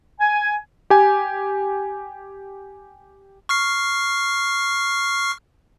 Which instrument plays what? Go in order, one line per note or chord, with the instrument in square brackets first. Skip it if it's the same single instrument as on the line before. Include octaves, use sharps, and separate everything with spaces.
[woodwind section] G#5
[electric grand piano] G4 G#5
[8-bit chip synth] C#6 F6 C7